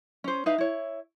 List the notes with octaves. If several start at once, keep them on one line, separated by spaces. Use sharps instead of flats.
C#4 C5
D#4 B4 E5 F5
E4 C#5